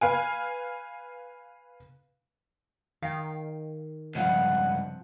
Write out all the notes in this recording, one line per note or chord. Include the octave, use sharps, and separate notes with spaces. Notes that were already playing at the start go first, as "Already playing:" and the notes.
B4 F5 G#5
D#3 F5 G5
C#2 G2 C3 F3 F5 F#5